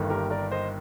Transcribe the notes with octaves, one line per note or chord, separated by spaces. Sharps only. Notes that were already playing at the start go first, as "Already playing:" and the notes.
Already playing: G1 G2 D#3 A#3
G4 A#4
A#4 D5
C5 D#5